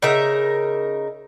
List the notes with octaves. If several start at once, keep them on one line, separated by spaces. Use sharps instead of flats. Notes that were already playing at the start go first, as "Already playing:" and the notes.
C#3 D#4 A#4 E5